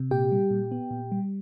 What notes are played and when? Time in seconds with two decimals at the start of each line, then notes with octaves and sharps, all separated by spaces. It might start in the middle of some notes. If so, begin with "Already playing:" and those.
Already playing: C3
0.11 A#2 G4 G5
0.32 G3
0.51 A#2
0.71 B3
0.91 A#2
1.12 G3